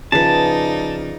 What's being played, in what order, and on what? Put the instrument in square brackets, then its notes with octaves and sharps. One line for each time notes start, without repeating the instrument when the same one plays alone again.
[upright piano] C#3 F3 F4 [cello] D#4 D5 [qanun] G#4 B4 [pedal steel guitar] A5